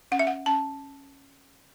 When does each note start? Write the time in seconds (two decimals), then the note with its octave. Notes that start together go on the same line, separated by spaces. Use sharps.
0.12 C#4 F#5
0.19 E5
0.27 F#5
0.46 C#4 A5